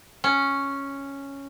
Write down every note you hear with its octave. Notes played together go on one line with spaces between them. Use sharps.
C#4